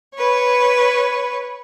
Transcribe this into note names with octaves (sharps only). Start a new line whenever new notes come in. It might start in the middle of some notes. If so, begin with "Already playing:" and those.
B4 C#5